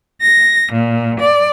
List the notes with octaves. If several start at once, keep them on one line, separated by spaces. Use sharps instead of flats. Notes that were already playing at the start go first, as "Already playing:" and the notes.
A#6
A#2
D5